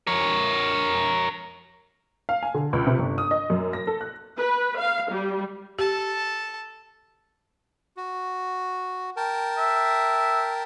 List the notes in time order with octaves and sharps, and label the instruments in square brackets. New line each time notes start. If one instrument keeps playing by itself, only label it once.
[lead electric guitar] A#4 C#5
[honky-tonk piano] F5
G#5
D3
C#2
C3
G1
D#6
D#5
F#2
A#6
A4
F#6
[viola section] B4
F5
G3
[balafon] G4 [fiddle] A4 A5
[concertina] F#4
A#4 G5 A5
[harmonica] E5